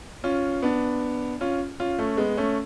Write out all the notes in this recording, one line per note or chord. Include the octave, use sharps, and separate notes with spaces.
C#4 F4
B3 D4
C#4 F4
C#4 F4
A3 C#4
G#3 B3
A3 C#4